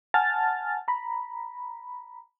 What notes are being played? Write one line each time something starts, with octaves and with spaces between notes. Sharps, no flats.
F#5 G#5 A5 F6 A6
A#5 B5